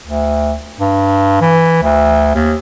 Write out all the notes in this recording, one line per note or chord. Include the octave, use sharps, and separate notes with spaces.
D2
G2
E3
D2
D#2